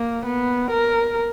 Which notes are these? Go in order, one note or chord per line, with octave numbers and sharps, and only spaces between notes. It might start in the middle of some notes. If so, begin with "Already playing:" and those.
Already playing: A#3
B3
A#4